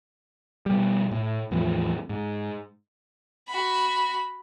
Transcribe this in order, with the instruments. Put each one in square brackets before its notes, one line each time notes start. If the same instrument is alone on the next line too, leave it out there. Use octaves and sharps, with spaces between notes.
[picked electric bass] B2 G3
A2
E2 A2 E3 F3
G#2
[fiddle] F#4 B5